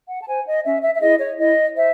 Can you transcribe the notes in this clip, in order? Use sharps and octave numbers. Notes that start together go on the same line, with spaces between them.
F#5
A5
C5 G#5
D#5
C#4 E5
E5
E5
E4 G#4 D#5
C#5
E4 D#5
C5 E5